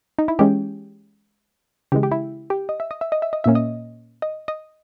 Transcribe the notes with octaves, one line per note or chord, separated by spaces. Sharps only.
D#4
E4
E3 G#3 C#4 G4
C#3 E3 G#3 G4
G4
E4
G4
D#5
E5
D#5
E5
D#5
E5
D#5
A#2 A#3 C#4 E5
D#5
D#5
D#5